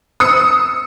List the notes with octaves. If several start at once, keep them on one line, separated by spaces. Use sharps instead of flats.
D#6 E6 C#7